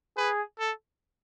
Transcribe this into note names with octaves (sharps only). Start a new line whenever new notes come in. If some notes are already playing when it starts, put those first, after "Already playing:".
G#4 B4
A4